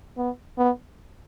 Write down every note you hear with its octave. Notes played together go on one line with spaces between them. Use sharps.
B3
B3